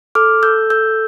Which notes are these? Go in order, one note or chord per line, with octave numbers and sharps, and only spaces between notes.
A4 D6 F6
A4 E6 G6
A4 E6 G6